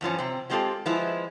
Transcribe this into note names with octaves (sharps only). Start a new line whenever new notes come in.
E2 G2 F3 C#4
C3 C4
F#3 G#3 C4 F4 G4 A4
F3 G#3 B3 E4